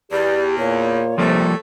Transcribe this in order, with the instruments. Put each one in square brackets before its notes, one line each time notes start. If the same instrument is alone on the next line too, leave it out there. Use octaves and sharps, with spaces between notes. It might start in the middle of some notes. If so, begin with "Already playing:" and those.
[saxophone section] E2 [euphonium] G4 [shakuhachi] D5
[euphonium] A#2 [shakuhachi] C#5
[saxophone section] A2 A3 [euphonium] C3 [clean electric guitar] F3 G3 A#3